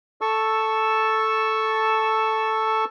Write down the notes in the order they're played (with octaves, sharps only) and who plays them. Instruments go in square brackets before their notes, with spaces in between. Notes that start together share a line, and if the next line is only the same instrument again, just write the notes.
[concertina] A4 A5 C#6 E6